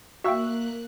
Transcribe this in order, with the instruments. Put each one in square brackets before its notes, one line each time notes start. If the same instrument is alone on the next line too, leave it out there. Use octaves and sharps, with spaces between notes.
[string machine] A#3 F#6 [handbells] F#4 F5 G5 [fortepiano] E5 C#6 E6